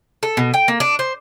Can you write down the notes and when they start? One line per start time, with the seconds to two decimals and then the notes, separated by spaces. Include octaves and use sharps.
0.23 A4
0.37 B2
0.54 G5
0.68 A#3
0.80 D4
0.99 C5